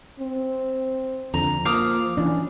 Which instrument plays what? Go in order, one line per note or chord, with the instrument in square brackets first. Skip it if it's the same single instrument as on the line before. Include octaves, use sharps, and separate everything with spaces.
[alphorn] C4
[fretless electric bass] F2 D3 [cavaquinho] A#5
[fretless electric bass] F3 [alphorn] A#3 [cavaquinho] F5 D6 D#6
[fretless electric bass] E3 D4 [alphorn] C#4